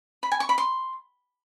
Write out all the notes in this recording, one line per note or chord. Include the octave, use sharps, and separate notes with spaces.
B5
G#5
C#6
B5
C6